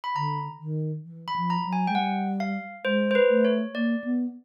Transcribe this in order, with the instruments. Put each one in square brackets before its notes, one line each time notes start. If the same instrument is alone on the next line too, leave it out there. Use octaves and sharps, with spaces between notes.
[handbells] B5
[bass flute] D3 [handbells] A#5
[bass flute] D#3
E3
[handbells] B5
[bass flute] F3
[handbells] A#5
[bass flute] F#3
[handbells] G#5
[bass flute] G#3 [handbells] G5
[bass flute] G3 [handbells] F#5
[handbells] F5
[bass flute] G#3 [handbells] C5
[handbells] C5
B4
[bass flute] A3
[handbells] C#5
[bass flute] A#3 [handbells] D5
[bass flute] B3